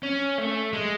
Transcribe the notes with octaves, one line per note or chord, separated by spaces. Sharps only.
C#4
A3
G#3